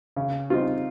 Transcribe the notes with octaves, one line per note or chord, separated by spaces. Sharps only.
C#3
G3 C4 D#4 F4